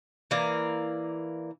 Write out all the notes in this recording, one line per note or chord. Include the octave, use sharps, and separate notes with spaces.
E3 A#3 A#4 D5